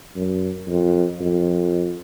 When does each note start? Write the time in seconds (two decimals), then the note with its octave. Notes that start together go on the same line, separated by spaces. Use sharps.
0.16 F#2
0.68 F2
1.20 F2